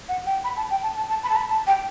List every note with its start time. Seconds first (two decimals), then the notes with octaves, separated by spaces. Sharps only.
0.09 F#5
0.26 G5
0.44 B5
0.57 A5
0.70 G5
0.83 A5
0.97 A5
1.10 A5
1.24 B5
1.30 A5
1.37 B5
1.49 A5
1.67 G5